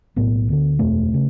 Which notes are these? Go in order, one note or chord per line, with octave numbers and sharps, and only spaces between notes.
B1 A2 B3
D2 D3
F#1 E2 B2 A3
C#3